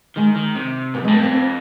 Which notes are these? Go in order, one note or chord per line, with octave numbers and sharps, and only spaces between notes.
D#3 G#3
D#3
C3
G#2 B3
F2 G#3
G2
B3
F2 C4
C4